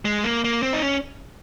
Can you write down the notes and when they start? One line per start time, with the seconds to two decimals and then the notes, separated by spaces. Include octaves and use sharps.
0.05 G#3
0.24 A#3
0.44 A#3
0.63 C4
0.73 D#4
0.82 C#4